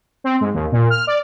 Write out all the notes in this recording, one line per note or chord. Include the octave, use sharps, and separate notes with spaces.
C4
G#2
D#2
A#2
F6
D5